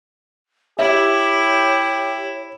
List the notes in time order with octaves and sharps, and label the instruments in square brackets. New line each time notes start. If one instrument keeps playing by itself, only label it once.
[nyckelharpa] E4 [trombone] G4 [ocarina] C#5 [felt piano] E5